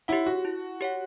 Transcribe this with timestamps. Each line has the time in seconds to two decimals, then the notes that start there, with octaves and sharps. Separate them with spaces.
0.08 E4 G4 C#5 F#5
0.27 F#4
0.45 E4
0.81 G4 C#5 F#5